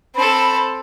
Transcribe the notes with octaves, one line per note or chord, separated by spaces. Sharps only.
C4 A4 B5